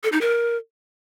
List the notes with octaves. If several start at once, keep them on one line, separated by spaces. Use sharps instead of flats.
A4
D#4
A#4